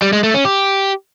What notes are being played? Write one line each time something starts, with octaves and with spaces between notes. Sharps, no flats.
G3
G#3
A3
C#4
G4